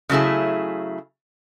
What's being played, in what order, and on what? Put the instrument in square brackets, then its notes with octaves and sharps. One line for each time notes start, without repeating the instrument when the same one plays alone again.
[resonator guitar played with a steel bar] C#3 F#3 A3 E4 G#4